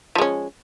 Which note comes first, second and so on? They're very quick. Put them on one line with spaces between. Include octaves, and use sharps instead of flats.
F3 G#3 C#4